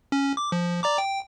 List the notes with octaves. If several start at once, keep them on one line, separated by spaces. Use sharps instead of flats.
C#4
D6
F3
D5 A#5 D6
G5